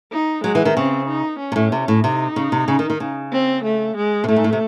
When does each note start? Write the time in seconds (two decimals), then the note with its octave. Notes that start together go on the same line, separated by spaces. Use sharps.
0.12 D#4
0.44 F#3 G#3
0.55 E3
0.65 D#3
0.76 C#3 C4
1.08 D#4
1.40 C#4
1.52 C3
1.56 A2
1.72 C3
1.88 A2
2.04 C3 D#4
2.36 C#3
2.52 C3
2.68 C#3
2.79 D#3
2.90 D#3
3.00 C#3
3.32 C4
3.64 A3
3.97 G#3
4.24 C3
4.28 A2 A3
4.36 G#2
4.44 A2
4.53 C3